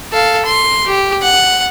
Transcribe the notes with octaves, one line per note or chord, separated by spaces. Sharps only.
A4 F5
C6
G4
F#5